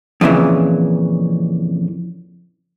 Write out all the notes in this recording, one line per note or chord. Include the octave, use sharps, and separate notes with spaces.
F2 A#2 C#3 E3